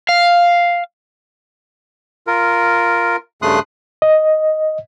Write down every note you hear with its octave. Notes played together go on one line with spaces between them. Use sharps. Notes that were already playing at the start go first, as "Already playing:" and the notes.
F5
F4 A#4
G2 C#3 A3 C6 D#6 F#6
D#5